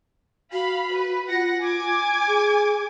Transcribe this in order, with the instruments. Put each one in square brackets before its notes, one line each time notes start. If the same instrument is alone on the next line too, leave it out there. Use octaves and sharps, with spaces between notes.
[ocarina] F#4 [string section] F5 B5
[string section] B4
[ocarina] F4 [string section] F#5 A#6
[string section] G#5 D6 G#6
[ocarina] G#4